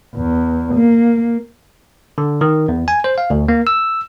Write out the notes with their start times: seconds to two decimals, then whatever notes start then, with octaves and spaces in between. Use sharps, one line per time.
0.15 E2
0.74 A#3
2.18 D3
2.41 D#3
2.68 E2
2.88 G#5
3.04 C5
3.18 F5
3.30 D2
3.48 A#3
3.67 E6